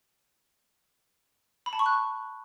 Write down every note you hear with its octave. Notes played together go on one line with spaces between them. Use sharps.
B5
A5
C#6
F#6